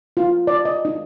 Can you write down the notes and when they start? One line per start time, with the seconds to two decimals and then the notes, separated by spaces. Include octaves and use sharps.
0.17 F4
0.47 D5
0.65 D#5
0.85 D#4